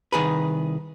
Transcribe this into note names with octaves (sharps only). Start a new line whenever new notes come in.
C2 D#3 G#4 B4